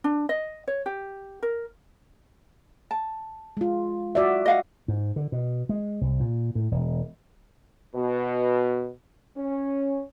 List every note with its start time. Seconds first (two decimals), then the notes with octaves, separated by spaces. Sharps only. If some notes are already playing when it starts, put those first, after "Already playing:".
0.04 D4
0.29 D#5
0.68 C#5
0.86 G4
1.43 A#4
2.91 A5
3.57 G#3 F4
4.15 F#4 D5 E5
4.46 D#5 F5 F#5
4.88 G#2
5.16 D3
5.32 B2
5.69 G#3
6.01 C2
6.20 A#2
6.55 A2
6.71 E1
7.95 B2
9.37 C#4